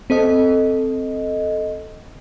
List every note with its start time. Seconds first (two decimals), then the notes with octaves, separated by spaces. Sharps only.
0.10 C4 A4 D#5